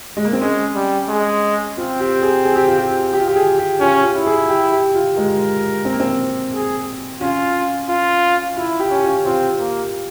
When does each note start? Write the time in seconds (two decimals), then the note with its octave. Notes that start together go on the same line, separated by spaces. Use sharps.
0.17 G#3
0.25 A#3
0.33 C4
0.41 G#3 C#4
0.75 G3
1.09 G#3
1.77 C4 F4
2.00 G4
2.22 G#4
2.45 G#4
2.56 G4
2.67 F4
2.78 G4
3.13 G4
3.20 F4
3.28 G4
3.36 G#4
3.58 G4
3.81 C#4 F4
4.04 F4
4.15 E4
4.27 G#4
4.49 G4
4.72 G4
4.95 F4
5.17 G#3 A#4
5.85 C4
5.93 A#3
6.00 C4
6.54 G#4
7.21 C#4 F4
7.90 F4
8.57 E4 F4
8.80 G4
8.91 C#4
9.03 F4
9.25 C4 F4
9.59 A#3